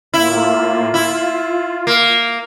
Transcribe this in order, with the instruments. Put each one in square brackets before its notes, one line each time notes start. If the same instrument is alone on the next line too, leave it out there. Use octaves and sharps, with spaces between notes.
[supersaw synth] A2 A#3 F4 [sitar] E4
[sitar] E4 [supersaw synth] F4
[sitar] A#3